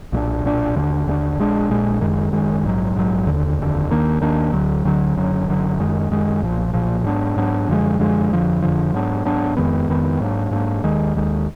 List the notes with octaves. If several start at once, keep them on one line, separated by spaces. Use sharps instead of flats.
B1 A#2 F#3 D4
B1 A#2 F#3 D4
D#2 D3 G#3 D4
D#2 D3 G#3 D4
A#1 A#2 G#3 D4
A#1 A#2 G#3 D4
F#1 F#2 D#3 G#3
F#1 F#2 D#3 G#3
A#1 G#2 F#3
A#1 G#2 F#3
F1 D#2 D3
F1 D#2 D3
D#2 D#3 A#3 D4
D#2 D#3 A#3 D4
D2 D3 F#3
D2 D3 F#3
F#1 F#2 D3 F#3
F#1 F#2 D3 F#3
F#2 D#3 G#3
F#2 D#3 G#3
B1 A#2 F3
B1 A#2 F3
G#2 F#3 B3 D4
G#2 F#3 B3 D4
F#2 D3 F3 G#3
F#2 D3 F3 G#3
F2 D3 F3
F2 D3 F3
G#2 F#3 B3 D4
G#2 F#3 B3 D4
F2 D#3 G#3 B3
F2 D#3 G#3 B3
G#2 F#3 A#3 D4
G#2 F#3 A#3 D4
D#2 D#3 G#3
D#2 D#3 G#3